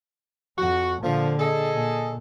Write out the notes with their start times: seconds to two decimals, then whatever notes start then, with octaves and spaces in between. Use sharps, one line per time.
0.57 F2 F#4
1.02 A#2 D3 F3
1.39 G#4 A4 D#5
1.73 A#2